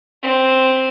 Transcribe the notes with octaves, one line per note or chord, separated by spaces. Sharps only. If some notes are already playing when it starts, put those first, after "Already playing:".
C4